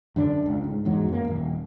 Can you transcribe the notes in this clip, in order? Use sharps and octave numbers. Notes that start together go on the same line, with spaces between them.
F#2 D3 D4
C#2
G#2
E2 G#2 F#3
F#2 A#3
D#1